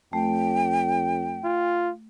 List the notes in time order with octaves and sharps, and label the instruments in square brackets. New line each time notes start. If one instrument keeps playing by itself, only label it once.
[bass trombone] F2 [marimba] A3 [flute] G5
[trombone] F4